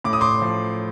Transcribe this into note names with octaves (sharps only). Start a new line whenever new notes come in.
A2 D6
D#6
C6 D6
F3